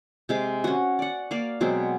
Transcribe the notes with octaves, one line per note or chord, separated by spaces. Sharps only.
C3 G#3 D6
C#4 F#4
D5 F#5
A#3 D5 F5
B2 F#3 G#3 C4